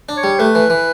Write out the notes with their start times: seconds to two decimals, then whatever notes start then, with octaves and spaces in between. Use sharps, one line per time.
0.09 D4
0.17 C#5
0.23 G3
0.39 A3 B4
0.55 E3
0.70 E3